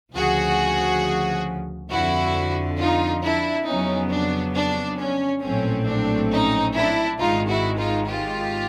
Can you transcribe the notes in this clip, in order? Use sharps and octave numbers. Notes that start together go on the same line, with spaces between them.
D2 C#3 F3 F#4 G#4
F2 D3 F3 E4 F#4
D#4 F4
D4 E4
F2 C#3 F#3 B3 C#4 D#4
D4
D4
C#4
A#1 A2 F#3 A3 C4 C#4
D4
C#4 D#4
D4 E4
G#1 G#2 D#3 G#3 D#4 F4
E4 F#4
D#4 F4
F4 G4